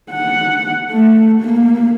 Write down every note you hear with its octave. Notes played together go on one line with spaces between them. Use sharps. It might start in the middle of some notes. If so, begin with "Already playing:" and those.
F#5
A3
A#3